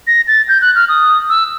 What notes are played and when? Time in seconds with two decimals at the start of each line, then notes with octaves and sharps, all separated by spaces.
0.07 A#6
0.28 A6
0.48 G6
0.62 F#6
0.75 F6
0.89 D#6
1.30 E6